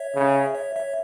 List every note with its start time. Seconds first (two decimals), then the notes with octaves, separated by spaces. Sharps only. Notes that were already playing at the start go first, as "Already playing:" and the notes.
Already playing: C#5 E5
0.15 C#3
0.55 C#5 E5
0.76 C#5 E5